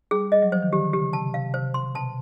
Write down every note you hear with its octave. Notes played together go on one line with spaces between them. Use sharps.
G3 G#4
G3 D#5
F#3
F3 C5
D#3
D3 G4
C#3 G4
C3 A5
C3 F5
C3 C5
C6
B2 A5